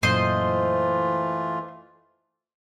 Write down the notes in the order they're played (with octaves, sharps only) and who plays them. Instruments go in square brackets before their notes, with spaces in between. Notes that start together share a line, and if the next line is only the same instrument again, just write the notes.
[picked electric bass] F#2 A#2 [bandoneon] E3 A3 F4 [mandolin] C5 D#5